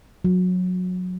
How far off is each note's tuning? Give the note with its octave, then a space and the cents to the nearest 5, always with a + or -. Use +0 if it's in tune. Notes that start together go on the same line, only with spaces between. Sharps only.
F#3 -25